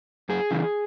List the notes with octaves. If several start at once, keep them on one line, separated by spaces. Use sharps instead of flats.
F#2 G#4
C#3 E3